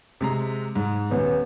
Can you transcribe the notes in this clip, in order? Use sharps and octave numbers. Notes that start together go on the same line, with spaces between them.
C3 G#3 A#5
G#2
D#1 B3